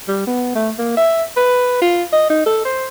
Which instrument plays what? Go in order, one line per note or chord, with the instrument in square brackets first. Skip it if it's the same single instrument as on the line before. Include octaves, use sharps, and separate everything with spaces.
[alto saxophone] G3
B3
A3
A#3
E5
B4
F4
D#5
D#4
A4
C5